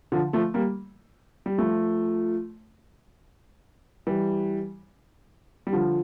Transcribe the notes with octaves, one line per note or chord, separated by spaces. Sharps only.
D3 F3
F3 A3
G3 A#3
G3
F3 A3
E3 G3
G3
D3 F3